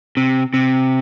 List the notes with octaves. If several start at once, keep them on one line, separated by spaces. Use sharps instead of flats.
C3
C3